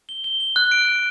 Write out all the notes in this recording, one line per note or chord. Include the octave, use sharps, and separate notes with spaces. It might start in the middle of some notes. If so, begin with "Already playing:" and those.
G7
G7
G7
F#6
D7
D7